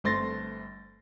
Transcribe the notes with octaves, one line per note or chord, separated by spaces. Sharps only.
G1 A3 C4 C6 A6 A#6